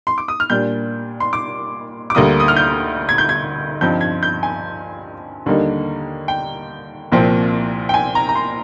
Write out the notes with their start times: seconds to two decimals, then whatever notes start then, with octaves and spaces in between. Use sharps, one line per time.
0.07 C6
0.18 D6
0.28 D#6
0.40 F6
0.50 A#2 G3 D4 G6
1.20 C6
1.33 D6
2.10 D6
2.15 D2 D3 G3 A#3 D#6
2.40 D#6
2.48 F6
2.57 G6
3.09 G#6
3.18 G6
3.29 G#6
3.81 G2 F3 C4 D#4 G6
4.01 G#6
4.23 G6
4.43 G#5
5.46 D#2 D3 G3 A#3 D#4
6.28 G5
7.12 C2 A#2 F3 C4
7.89 G5
7.94 G#5
8.15 A#5
8.29 A#5
8.36 C6